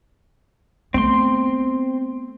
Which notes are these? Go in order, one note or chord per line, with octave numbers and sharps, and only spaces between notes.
A3 B3 C4 C6